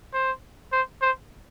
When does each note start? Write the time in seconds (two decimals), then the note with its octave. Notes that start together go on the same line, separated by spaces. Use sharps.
0.14 C5
0.72 C5
1.02 C5